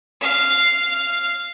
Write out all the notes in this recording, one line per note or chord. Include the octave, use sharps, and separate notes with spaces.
F5